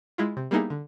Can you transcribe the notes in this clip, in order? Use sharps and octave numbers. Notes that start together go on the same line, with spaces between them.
G#3 E4 F4
C3
G3 A#3 B3 D#4 E4 G#4
D3